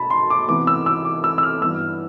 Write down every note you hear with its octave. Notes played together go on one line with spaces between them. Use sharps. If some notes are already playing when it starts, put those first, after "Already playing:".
Already playing: B2 A5 B5
C6
D6
C3 E3 B3 D6
E6
E6
D6
E6
E6
F6
G2 E3 B3 E6